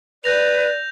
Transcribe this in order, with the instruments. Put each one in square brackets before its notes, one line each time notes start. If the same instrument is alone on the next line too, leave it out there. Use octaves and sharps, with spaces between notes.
[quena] B4 [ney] D5 [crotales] G6 A#6 F7